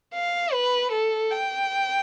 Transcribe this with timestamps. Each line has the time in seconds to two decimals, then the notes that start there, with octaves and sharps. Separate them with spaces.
0.14 F5
0.53 B4
0.92 A4
1.31 G5